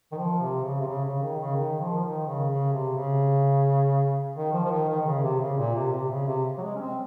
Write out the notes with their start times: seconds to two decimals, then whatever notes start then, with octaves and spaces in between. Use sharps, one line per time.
0.12 D#3
0.17 F3
0.41 C3
0.64 C#3
0.81 C3
0.87 C#3
1.04 C#3
1.22 D#3
1.40 C#3
1.57 D#3
1.80 F3
1.97 F3
2.04 D#3
2.26 C#3
2.50 C#3
2.73 C3
2.97 C#3
4.36 D#3
4.53 F3
4.64 F3
4.71 D#3
4.89 D#3
5.01 D#3
5.06 C#3
5.23 C3
5.41 C#3
5.58 A#2
5.75 C3
5.93 C3
6.11 C#3
6.27 C3
6.58 F#3
6.63 G#3
6.75 C#4
6.80 C4